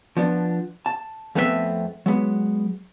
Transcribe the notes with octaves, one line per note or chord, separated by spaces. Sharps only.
F3 B3 D4
A5
F2 A3 B3 C4 F#4 E5
F#3 G#3 B3